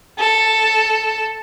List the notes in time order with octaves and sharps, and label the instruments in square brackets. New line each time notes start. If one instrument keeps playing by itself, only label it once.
[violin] A4